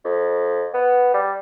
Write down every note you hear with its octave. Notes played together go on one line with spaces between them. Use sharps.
F2
B3
G3